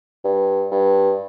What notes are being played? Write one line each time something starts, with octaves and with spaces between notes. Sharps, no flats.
G2
G2